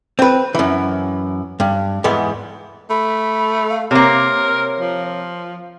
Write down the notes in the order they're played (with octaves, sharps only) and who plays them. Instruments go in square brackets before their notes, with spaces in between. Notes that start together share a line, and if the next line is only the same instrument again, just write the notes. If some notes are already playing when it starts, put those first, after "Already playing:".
[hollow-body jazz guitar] C4 B4
F#2 E3
G2
E2 G#2 B3
[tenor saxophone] A3 [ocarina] B5
[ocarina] F5
[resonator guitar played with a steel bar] C3 A#3 [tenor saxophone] A#4 [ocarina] C#5
[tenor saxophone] F3